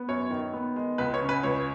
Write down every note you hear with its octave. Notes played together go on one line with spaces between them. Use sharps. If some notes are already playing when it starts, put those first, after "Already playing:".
Already playing: B3
F#2 C#5
D#3
B3
G#3
C#2 B4
C#5
C#3
B4
C#2 C#5